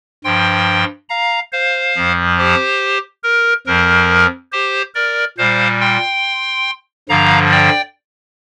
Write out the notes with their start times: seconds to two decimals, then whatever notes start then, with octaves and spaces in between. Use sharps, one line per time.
0.24 G2 F3 G5 C6
1.09 F5 A#5
1.52 C5 F5
1.95 F2 F3
2.38 G4 C5
3.23 A#4
3.66 F2 F3 A#4
4.52 G4 C5
4.94 A#4 D5
5.38 A#2 G3 C5 F5
5.81 G5 C6
7.09 G2 D3 F3 F5 A#5
7.51 D5 G5